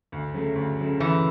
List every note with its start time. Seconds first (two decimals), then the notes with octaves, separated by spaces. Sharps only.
0.12 D2
0.33 C#3 F#3 A3
0.55 D2
0.79 C#3 F#3 A3
1.00 D2 E3